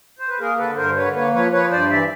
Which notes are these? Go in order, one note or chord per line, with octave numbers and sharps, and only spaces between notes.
C5
B4
A#3 G#4 A#4
D3 A4 B4
G2 A#4 C5
D3 B4 C#5
A#3 B4 C#5
F3 B4 C#5
F3 B4 C#5
G2 C5 D5
E3 D5 E5